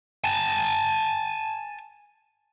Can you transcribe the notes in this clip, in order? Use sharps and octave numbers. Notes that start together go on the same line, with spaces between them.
G#5 A5